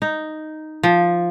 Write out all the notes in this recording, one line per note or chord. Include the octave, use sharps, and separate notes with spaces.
D#4
F3